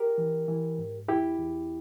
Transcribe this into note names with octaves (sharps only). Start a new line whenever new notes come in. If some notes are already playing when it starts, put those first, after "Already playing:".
Already playing: G4 A#4
E3
E3
G#2
E2 E4 G4
E2